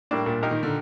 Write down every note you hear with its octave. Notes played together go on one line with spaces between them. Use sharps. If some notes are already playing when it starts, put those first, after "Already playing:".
A2 G3 A#3 D4
A#2
A#3 D#4 G4 A#4
D#3
D3